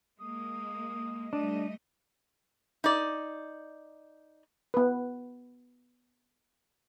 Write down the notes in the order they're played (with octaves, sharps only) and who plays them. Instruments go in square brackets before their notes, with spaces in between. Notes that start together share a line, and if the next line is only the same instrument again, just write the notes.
[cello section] G#3 A#3 [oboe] D#6
[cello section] G3 A3 D#5 [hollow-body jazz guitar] D4
[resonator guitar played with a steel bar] D#4 D5
[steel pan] B3 B4